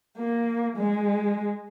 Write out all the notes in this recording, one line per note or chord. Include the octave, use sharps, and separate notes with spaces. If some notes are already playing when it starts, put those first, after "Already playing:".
A#3
G#3